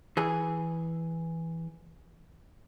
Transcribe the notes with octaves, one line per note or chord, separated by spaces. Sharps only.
E3 G#4